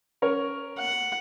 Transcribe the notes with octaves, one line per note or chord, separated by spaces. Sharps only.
C#4 A#4 C#5
F#5